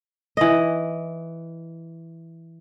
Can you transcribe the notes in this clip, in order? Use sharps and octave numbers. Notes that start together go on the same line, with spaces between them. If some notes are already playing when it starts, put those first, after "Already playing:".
E3 D#5